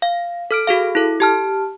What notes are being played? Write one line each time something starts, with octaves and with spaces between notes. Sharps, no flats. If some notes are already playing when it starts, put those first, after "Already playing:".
F5
A4 F6 D7
F#4 G#4 F5
E4 A4
G4 A5 F6